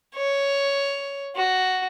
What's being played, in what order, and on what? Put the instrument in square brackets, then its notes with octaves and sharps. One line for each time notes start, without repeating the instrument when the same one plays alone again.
[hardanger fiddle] C#5
F#4